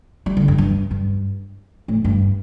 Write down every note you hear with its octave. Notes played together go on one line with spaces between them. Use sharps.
G3
D3
G2
G2
G2
A2
G2